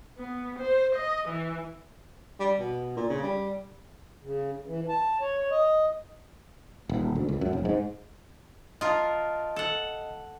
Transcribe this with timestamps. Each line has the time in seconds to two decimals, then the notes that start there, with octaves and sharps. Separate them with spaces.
0.18 B3
0.60 C5
0.96 D#5
1.29 E3
2.40 G3
2.59 B2
2.97 A#2
3.10 C#3
3.23 G3
4.23 C#3
4.67 E3
4.89 A5
5.21 C#5
5.38 C#5
5.51 D#5
6.89 D#1
7.15 D2
7.29 C#2
7.41 F#2
7.53 F1
7.65 G#2
8.81 F4 A#4 D#5 F5 A5
9.56 A4 F#5